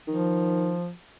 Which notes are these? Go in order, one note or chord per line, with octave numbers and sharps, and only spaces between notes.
D#3 F3